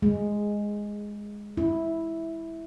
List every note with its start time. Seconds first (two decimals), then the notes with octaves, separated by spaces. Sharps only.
0.02 G#3
1.57 E4